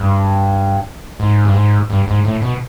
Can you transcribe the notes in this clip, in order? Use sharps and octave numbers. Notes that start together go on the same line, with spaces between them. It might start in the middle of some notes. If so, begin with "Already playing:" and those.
Already playing: G2
G#2
G2
G#2
G2
G#2
A2
B2